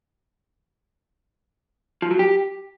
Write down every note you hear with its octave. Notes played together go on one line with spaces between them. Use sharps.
F3
F#3
G4